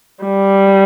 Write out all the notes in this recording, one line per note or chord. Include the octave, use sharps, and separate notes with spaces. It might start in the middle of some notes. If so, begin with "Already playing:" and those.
G3